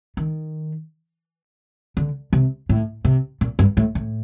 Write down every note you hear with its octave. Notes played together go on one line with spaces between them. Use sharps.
D#3
D3
C3
A2
C3
A#2
G2
A2
A2